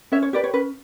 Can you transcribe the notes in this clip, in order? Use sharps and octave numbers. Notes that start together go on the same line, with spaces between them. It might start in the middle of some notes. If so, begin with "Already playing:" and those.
C#4 C#5 E5
C#5
G4 B4 D5
C#5
C#4 B4